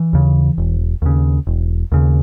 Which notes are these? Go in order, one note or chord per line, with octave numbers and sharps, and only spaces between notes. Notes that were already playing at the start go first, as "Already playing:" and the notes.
Already playing: E3
D#2 C#3
E1
D#2 C#3
E1
D#2 C#3